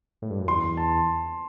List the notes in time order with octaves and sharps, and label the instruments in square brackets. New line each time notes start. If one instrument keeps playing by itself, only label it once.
[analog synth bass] A2
G2
F#2
[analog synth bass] E2 [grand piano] C6
[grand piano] A5